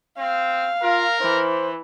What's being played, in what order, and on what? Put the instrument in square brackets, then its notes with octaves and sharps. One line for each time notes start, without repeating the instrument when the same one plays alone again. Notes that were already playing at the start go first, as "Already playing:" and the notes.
[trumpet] C4 [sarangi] F5
[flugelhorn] F4 [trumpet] A#4
[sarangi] E3 [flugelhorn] C5